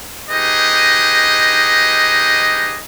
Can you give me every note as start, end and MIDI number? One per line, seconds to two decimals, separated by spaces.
0.29 2.79 63
0.29 2.79 67
0.29 2.79 68
0.29 2.79 71
0.29 2.79 75